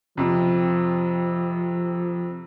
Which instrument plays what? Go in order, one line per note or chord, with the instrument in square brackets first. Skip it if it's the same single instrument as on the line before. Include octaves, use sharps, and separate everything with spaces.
[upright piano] F2 C3 [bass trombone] F3